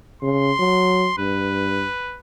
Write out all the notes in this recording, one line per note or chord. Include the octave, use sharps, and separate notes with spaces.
C#3 C6
F#3
G2 B4